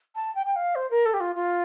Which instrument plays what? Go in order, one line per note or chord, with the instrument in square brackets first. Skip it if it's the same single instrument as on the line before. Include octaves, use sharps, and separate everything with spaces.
[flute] A5
G5
G5
F5
C5
A#4
A4
G4
F4
F4